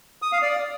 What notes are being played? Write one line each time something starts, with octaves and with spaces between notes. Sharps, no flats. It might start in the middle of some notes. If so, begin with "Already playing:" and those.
D#6
F5
D5